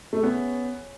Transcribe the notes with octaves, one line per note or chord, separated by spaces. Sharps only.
A3
B3 C#4 G#4 C#5 E5